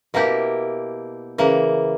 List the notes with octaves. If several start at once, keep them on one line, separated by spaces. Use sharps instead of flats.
B2 A#3 E4 G4
C#3 E3 A#3